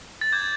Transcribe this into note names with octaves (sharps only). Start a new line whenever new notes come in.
A6
D6 G6 G#6